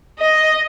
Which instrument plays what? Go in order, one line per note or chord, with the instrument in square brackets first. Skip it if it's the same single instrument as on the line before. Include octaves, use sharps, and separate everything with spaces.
[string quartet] D#5